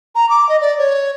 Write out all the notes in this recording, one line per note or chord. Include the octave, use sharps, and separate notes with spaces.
A#5
D6
D#5
D5
C#5